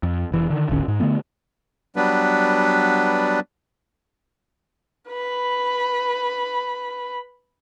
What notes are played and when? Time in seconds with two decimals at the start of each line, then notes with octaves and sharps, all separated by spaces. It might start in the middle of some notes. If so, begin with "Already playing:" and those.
0.03 F2
0.32 F1 E3
0.50 D3 D#3
0.69 D1 G#1 D3 C#4
0.88 G#2
1.00 D3 D#3 A3 B3
1.96 F#3 G3 B3 D4 B4
5.09 B4 B5